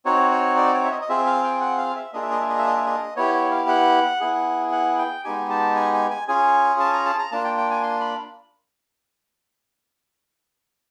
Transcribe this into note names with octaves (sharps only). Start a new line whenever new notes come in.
C4 D#4 F#4 C#5
C#5
D5
C#5
E5
D#5
D#5
C4 F4 G#4 E5
F5
G5
F#5
F5
E5
A#3 D4 F4 G#4 D#5
E5
D#5
E5
D#5
E5
D#5
E5
D#5
B3 E4 G4 C#5
C#5
F5
F#5
B3 E4 G#4
F#5
G5
G#3 B3 D#4 G4 G#5
A5
G#5
G#5
G#5
C#4 F4 G#4 G#5
A5
A#5
A5
A#5
A#3 D4 F4 A5
G5
G5
G#5
C6
B5